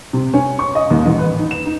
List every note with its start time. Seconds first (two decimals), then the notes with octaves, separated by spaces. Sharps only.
0.13 C3
0.34 C#4
0.59 C#6
0.75 D#5
0.90 D#2
1.06 A1
1.19 B4
1.39 D#4
1.51 E7
1.66 D#4